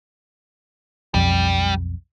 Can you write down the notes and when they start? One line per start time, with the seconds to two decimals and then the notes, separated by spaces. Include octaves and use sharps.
1.15 B1 F2 G3